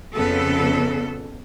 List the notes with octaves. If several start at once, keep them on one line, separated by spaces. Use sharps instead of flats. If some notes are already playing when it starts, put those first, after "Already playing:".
F2 C#3 B3 A4